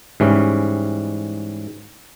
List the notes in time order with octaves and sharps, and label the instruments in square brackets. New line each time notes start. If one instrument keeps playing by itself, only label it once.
[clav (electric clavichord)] G#2 E3 G3 C#4